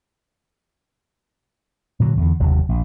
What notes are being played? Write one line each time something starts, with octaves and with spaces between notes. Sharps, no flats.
A#2 D3 F#3
E2 D3
F#1 D#2 C3 F#3
A#1